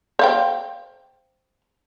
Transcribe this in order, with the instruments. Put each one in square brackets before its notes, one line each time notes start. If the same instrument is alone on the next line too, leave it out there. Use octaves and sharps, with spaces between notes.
[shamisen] C5 F5 G5